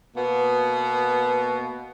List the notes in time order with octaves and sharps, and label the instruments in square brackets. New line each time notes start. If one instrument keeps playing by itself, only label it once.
[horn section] B2 A#3 B3